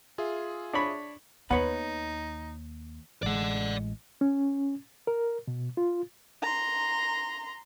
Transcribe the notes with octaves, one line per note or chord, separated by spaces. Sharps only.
F4 G#4 E5
D4 C#5 B5
D#2 B3 D#4 B4 C#5 B5
A1 G#3 D5 F#5
C#4
A#4
B2
F4
A#5 C6